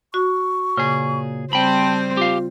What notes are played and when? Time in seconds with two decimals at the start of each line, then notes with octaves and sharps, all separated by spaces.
0.14 F#4 C#6
0.78 A#2 C#3 G#4
1.53 G3 C4 C5 G5 A5 B5
2.17 F4 G4 F5